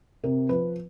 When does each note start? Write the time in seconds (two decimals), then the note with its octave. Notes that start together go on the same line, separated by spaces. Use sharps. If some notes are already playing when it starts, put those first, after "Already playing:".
0.23 C3 A#4
0.49 F3 B4